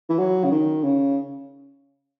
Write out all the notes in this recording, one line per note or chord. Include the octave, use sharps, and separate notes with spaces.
E3
F#3
C#3
D#3
C#3